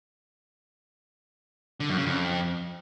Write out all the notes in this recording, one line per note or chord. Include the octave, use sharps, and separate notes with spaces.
D3
F#2
C#3
F2